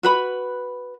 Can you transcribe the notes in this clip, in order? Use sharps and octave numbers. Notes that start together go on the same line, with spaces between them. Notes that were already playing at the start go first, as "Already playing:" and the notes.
F#4 B4 B5